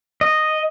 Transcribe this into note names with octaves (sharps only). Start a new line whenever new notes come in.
D#5